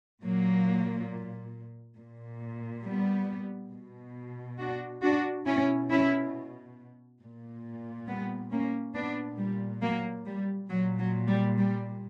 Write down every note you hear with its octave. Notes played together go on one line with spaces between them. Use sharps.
A#2 F#3 A#3
A#2
G3 B3
B2
D4 F#4
D4 F#4
B2 C#4 E4
C#4 E4
A#2
G3 B3
A#3 C#4
A#2 B3 D4
G3
F#3 A#3
G3
A#2 F#3
F#3
G3
G3